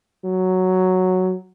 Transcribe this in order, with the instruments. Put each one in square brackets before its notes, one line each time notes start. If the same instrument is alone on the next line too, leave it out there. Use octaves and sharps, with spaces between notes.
[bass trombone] F#3